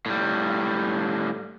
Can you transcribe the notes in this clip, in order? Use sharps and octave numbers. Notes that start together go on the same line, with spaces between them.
A2 G3